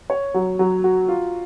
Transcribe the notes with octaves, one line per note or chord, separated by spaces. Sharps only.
C#5
F#3
F#3
F#4
F4